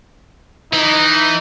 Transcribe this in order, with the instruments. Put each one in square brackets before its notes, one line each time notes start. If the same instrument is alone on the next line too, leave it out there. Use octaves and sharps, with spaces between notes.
[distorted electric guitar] E3 [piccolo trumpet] D#4